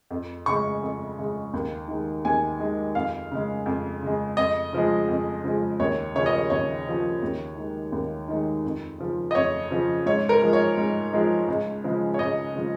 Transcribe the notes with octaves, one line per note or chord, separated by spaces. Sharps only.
F2
C#3 G#3 C#6
F2
C#3 G#3
D#2
D#3 G#3
D#2 G#5
D#3 G#3
F2 F5
C#3 G#3
F2
C#3 G#3
F2 D#5
C#3 F3 G#3
F2
C#3 F3 G#3
D#2 C#5
C#3 F3 C#5
D#5
C#5
D#2 C#5
C#3 F3
D#2
D#3 G#3
D#2
D#3 G#3
F2
C#3 F3
D#5
F2 C#5
C#3 F3
G#2 C#5
A#4
F3 G#3
C#5
G#2
F3 G#3
C#2
C#3 F3 G#3
C#5
C#2 D#5
C#3 F3 G#3